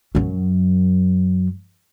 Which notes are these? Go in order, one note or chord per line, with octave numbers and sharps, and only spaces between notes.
F#2 F#3